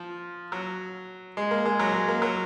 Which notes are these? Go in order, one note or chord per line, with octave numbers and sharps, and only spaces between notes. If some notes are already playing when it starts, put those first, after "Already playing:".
Already playing: F3
F#3
G#3
A#3
G#3
F#3
G#3
A#3
F#3